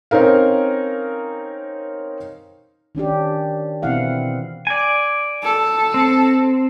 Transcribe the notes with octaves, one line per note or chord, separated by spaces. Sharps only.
C4 C#4 D#4 A#4 F5
D#3 C#4 D4 G4
B2 E3 C4 E4 F5 F#5
D5 G#5
A4
C4